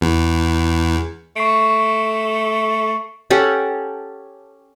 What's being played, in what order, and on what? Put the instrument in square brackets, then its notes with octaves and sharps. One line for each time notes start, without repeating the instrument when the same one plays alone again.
[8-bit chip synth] E2
[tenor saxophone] A3 [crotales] C#6 C7 D7
[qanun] C#4 G4 A4 F#5